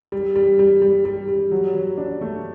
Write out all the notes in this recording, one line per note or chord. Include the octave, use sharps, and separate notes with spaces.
G3
G3
G3
G3
G3
G3
F#3
F#3
D4
A3